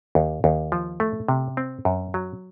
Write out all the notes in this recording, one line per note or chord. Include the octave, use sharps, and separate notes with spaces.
D#2
D#2
F3
A3
C3
C4
F#2
F#3